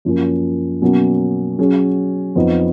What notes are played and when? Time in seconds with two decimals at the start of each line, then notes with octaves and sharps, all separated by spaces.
0.05 F#2 F3 A#3 C#4
0.82 B2 F#3 A#3 C#4
1.59 F#3 C#4 G#4
2.35 F2 F3 B3 D#4